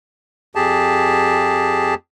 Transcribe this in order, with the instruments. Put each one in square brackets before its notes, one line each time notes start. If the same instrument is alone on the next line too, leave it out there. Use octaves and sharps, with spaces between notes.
[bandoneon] F2 G4 G#4 A5